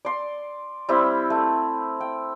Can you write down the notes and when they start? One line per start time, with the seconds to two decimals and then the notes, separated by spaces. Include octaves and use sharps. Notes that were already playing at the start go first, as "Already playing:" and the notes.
0.05 D5 C6
0.89 G3 C4 E4
1.30 A3
2.01 G5